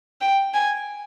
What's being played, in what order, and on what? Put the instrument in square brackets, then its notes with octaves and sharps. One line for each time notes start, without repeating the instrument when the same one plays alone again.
[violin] G5
G#5